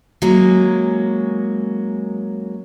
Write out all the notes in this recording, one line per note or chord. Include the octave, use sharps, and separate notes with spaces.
F#3 G#3 A#3 C#4